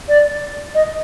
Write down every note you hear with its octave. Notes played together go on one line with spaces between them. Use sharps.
D5
D#5